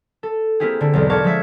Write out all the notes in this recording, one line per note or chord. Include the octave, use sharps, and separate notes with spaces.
A4
A#3 C4 E4 G4 G#4
D3 E4 A4
B1 E2
A#4 F5 A5 C#6 D6 G#6
F3 G#3 E5 G#6